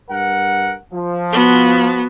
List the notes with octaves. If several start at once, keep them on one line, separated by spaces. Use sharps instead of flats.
G2 A#4 F#5
F3
B3 F#4